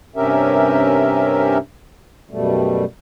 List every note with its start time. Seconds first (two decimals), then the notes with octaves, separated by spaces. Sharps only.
0.16 G2 C3 C#4 G4 A#4 E5
2.30 F#2 B2 G3 A3